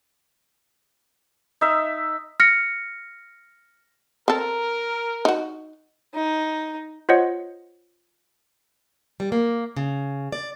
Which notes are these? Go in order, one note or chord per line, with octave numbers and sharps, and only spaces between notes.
D#4 E5
F6 A#6 C#7
C4 A4 A#4
D#4 F#4
D#4
F4 C5 C#5 D#5 F#5
G3
A#3
C#3
D5